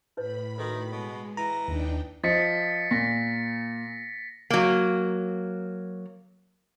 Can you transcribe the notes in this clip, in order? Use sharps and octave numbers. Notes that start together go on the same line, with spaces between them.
A2 E4 B4 C#5 B5
D#3 F#4 A4 B4
B2 G#3
E3 A#5 A#6
D#2 D4 D#4 G5
F3 D#5 A6 B6 C#7
A#2 A#6 B6
F#3 A#3